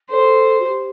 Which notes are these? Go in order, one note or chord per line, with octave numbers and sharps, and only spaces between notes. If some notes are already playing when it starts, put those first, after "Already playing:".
A4 C5
F#4
G4